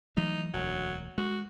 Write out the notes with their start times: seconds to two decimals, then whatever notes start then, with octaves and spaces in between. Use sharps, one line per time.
0.17 E3 F#3 A3 D#4
0.54 E1 D2 F#3
1.18 G#3 F#4